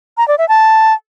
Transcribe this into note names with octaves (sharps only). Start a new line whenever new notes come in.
A#5
D5
E5
A5